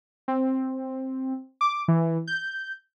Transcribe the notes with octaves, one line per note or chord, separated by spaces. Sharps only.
C4
D6
E3
G6